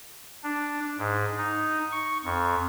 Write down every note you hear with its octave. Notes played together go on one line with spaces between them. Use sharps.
D4
G#2
D#4
C#6
F2